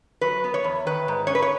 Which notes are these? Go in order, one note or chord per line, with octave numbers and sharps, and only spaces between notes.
F#3 B4
B3
C#5
E2
D#3 B4
G#2
C#4 C#5
B4
C#5